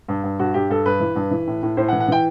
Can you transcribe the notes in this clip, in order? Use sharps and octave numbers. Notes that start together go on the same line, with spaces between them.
G2
G2
G2 F#4
G2 G4
G2 A4
G2 B4
E3
G2
E3
A2
A2
A2 C5
F#5
E3
F#5
E3 G5